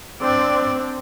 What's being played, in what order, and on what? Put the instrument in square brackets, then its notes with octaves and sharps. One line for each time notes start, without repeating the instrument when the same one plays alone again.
[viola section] C4 D4 [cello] D5